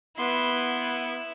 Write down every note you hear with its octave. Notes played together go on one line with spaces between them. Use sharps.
B3 E4 C6